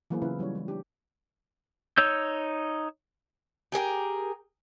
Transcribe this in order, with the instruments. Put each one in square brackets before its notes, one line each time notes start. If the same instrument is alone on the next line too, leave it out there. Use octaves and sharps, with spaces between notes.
[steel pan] E3 F#3 A#3 B3 G#4 C5
C#3 C#4 E4 F4 B4
F#3 G3 C#4 C#5
E3 G#3
D4 G4
[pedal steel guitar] D#4 C#5 E6 G6
[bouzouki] G4 G#4 A#4 G5